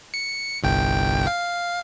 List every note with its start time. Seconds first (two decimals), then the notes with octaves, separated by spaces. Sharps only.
0.14 C#7
0.63 G1 C2 G5
1.27 F5